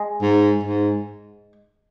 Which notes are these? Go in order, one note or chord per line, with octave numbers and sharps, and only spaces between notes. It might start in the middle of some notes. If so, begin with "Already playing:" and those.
Already playing: G#3
G#2
G#2